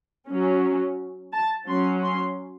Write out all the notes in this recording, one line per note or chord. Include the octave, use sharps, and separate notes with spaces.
F#3 C#4
A5
F#3 C#4 C6
C6